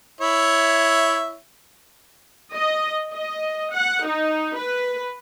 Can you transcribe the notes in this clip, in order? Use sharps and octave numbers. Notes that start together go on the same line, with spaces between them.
E4 C#5 E5
D#5
D#5
F#5
D#4
B4